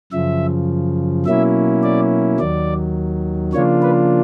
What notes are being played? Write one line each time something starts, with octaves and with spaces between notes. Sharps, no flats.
F#2 C#3 F3 E5
B2 F#3 A#3 C#4 E4 E5
D5
D#2 D#3 F#3 D5
C#3 F3 A#3 D4 F4 C#5
B4